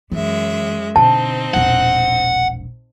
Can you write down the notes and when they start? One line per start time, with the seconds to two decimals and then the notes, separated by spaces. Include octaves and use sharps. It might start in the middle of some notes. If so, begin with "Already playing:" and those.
0.12 F#2 E3 G#3 E5
0.96 B2 D3 C4 D#4 A5
1.54 E1 A#1 F#5